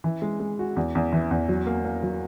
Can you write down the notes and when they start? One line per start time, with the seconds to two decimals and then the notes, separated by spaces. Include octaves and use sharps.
0.04 E3
0.22 G#3
0.40 G#3
0.59 F#4
0.76 E2
0.95 E2
1.12 E3
1.31 E2
1.49 F#3
1.67 A#3
1.85 A#3
2.03 F#3